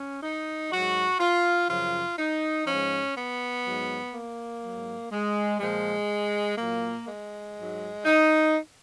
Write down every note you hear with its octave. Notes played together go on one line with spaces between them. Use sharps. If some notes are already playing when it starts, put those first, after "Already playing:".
Already playing: C#4
D#4
G#2 F#3 F#4
F4
F#2 C#3 F3 F4
D#4
G#2 F3 C#4
B3
G#2 F#3
A#3
G#2 F#3
G#3
A#2 F3 G#3
A#2 F#3 A#3
G#3
G#2 F#3
D#4